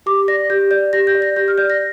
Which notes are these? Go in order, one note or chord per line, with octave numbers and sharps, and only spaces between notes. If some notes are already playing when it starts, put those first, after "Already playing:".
G4 D6
D5 A#6
G4 G6
D5 G6
G4 A#6
G6
D5
A#6
G4 G6
F6
D5 G6
A#6